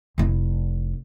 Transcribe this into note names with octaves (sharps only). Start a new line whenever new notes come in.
F1 E4